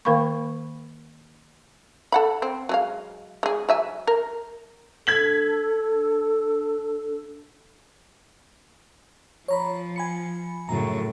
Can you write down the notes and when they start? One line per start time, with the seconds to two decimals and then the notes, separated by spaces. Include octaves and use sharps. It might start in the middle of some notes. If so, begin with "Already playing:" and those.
0.05 D#3 A#3 A#4 F5 B5 C#6
2.12 A4 F#5 B5
2.42 C4
2.69 F#3 G#3 F5
3.43 G#3 G#4
3.69 F#3 E5 G#5
4.07 A#4
5.07 D4 A4 G#6 B6 F#7
9.48 F3 C#5 A#5 B5
9.96 G#5 B5 C#7
10.69 F#2 A2 C#3 A#5